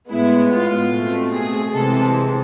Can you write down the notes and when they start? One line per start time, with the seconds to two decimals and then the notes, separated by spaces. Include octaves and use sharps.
0.10 A2 G#3 B3 E4
0.50 F4
0.91 B2 A3 C4
1.33 G#4
1.73 C3 E3 G#3 C4 A4